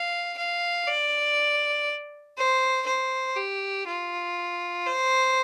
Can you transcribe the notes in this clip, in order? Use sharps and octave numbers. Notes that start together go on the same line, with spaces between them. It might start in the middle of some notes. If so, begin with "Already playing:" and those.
Already playing: F5
F5
D5
C5
C5
G4
F4
C5